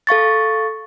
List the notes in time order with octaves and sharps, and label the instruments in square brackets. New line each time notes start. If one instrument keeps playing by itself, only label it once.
[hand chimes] A4 F5 C#6 A6